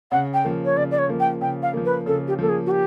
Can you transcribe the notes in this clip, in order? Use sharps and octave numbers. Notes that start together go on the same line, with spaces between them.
C#3 F#5
G5
F3 A#3
C#5
C#3 D5
D5
C#5
F3 A#3
G5
C#3 G5
F5
F3 A#3
B4
C#3 A4
G4
F3 A#3 A4
G#4
F#4
G4